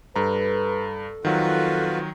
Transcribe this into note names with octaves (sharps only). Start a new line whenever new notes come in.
G2 A4 B4 A#5
F2 D#3 F#3 F4 F#4 B4